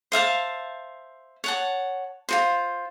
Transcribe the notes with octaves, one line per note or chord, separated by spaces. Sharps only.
C5 E5 F5 A5
C#5 F#5 A5
F4 F#4 C5